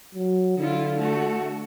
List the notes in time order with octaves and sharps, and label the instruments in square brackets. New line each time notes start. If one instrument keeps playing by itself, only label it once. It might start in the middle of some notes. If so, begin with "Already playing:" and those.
[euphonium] F#3
[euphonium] D3 [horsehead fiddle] E4 F4
[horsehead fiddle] A3 F#4